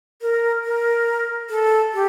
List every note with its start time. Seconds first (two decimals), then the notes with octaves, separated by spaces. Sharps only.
0.21 A#4
0.64 A#4
1.50 A4
1.94 G4